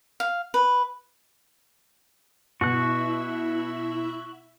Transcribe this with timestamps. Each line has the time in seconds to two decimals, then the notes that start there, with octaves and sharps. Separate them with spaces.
0.20 F5
0.54 B4
2.61 B2 E4 F#4 E5 F#6